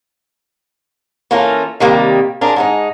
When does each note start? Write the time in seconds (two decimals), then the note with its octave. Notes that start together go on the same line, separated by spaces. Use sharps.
1.31 E3 A#3 C#4 F4 A4 A#4
1.80 C3 D#3 G3 A#3
2.41 D4 F4 G#4 A#4
2.56 G#2 G#3 D#4